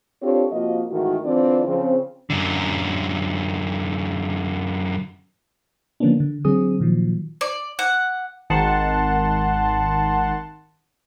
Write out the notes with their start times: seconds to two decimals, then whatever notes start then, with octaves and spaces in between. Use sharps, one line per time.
0.23 C4 D4 F4 G4 A4 C#5
0.52 C3 F3 A#3 F4 F#4 D#5
0.91 G#2 D#3 E3 A3 F#4
1.25 D3 E3 C4 D4 F4 D5
1.67 C#3 F3 C4
2.30 F#2 D3
6.00 D3 F3 A#3 B3 C#4 D4
6.20 D3
6.45 D3 F#3 C4 G#4 D#6
6.80 A#2 D#3 F3 F#3
7.41 D5
7.79 F#5
8.50 G#1 D#3 F#5 A5 C6